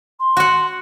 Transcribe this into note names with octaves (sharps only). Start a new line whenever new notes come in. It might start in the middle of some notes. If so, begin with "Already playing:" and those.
C6
F#4 F#5